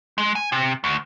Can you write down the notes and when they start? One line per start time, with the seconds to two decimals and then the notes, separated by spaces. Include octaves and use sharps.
0.18 G#3
0.35 G#5
0.52 C3
0.84 D2